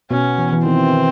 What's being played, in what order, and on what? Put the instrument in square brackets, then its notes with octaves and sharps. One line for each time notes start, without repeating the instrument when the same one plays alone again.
[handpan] B2 B3 [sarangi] C#4
[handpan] E3
E3
[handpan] D#3 [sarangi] C4
[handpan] D#3